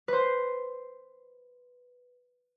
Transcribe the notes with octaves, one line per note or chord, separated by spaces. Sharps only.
B4 C5